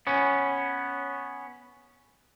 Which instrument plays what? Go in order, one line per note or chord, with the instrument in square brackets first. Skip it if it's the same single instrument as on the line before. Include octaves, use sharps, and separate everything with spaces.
[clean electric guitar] B3 C#4